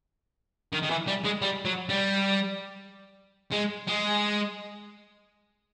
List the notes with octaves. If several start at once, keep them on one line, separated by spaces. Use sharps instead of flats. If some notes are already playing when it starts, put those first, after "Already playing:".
D#3
D#3
E3
G3
G#3
G3
F#3
G3
G#3
G#3